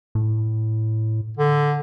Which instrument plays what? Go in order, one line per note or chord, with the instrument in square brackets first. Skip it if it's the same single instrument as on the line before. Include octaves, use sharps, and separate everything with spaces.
[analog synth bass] A2
[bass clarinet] D3